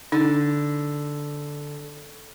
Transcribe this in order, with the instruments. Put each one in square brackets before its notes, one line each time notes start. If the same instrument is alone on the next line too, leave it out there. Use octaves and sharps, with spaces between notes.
[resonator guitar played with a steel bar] D3 [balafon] D#4